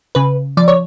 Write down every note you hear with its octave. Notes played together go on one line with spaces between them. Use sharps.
C#3 B4
F3 D5
C#5